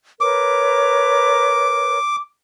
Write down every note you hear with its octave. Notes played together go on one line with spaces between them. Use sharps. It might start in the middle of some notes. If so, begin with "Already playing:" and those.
A#4 B4 C#5 D6